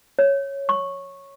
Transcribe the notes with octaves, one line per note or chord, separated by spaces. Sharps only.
C#5
C#6